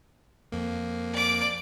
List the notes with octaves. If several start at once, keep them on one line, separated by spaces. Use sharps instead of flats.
F2 A#3
D5 D6